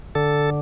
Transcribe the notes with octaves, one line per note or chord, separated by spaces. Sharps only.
D3 A4